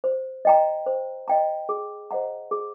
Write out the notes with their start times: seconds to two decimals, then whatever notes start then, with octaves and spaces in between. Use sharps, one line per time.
0.04 C5
0.45 D#5 G5 A#5
0.86 C5
1.28 D#5 G5 A#5
1.69 G#4
2.11 C5 D#5 F#5 A#5
2.51 G#4